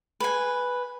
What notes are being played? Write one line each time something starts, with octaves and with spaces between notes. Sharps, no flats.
B4 G#5